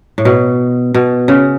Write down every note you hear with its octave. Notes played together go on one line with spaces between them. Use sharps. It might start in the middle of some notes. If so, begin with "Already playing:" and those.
A2
B2
B2
C#3